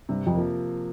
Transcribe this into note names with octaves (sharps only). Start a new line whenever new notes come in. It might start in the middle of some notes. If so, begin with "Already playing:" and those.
G2 C3
F2
F3 A#3